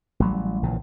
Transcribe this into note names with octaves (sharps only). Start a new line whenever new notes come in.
A1 F#3 G3
A#1 A#2 C#3 E3